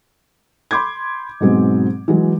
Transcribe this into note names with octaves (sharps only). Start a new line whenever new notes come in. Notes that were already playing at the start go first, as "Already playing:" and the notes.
B5 C6 D6 G6 G#6
G#2 B2 F#3 G#3 C4
E3 F#3 G#3